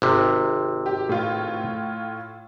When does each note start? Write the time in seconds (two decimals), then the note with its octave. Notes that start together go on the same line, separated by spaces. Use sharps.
0.02 G#1 C3
0.86 G4
1.09 A2 F4